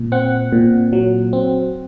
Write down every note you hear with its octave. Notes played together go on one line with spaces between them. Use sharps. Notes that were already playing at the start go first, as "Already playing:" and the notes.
Already playing: A#2
C4 F#5
A#2
F#3
C4